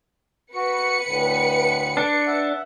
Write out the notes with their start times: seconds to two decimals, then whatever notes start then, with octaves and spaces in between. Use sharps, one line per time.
0.55 F#4 B4 C#7
1.07 D2 A2 D3
1.97 D4
2.27 E5 F#5